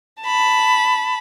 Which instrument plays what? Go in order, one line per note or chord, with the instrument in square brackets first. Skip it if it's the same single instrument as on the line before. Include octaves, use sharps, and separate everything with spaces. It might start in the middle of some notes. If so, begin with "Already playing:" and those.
[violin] A5 B5